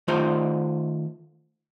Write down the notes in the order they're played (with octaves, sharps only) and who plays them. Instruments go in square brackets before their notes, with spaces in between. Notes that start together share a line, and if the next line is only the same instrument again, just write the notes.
[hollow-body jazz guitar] D#3 A3 F4 C5 D#5